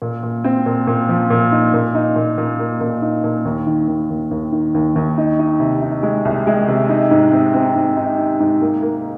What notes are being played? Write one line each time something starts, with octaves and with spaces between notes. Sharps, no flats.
A#2
A#2
C4
A#2
A#2
F3
A#2
D#4
A#2
D#4
A#2
A#2
A#3
A#2
D#4
A#2
D#2
D#3
D#2
D#2
D#2
D#3
D#2
D#2
D#4
D#4
C3
D#4
G#3
C2
G#3
C3
D#4
G#2
C4
C4
G#2
D#4
D#4
G#2
A#3
A#3